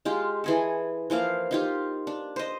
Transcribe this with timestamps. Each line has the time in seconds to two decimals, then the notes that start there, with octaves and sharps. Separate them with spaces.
0.05 G#3 F4 G4
0.44 E3 G#4 A4
1.10 E3 F3 A#3 F5
1.51 D#4 F4 G4
2.07 D4
2.36 C5 D#5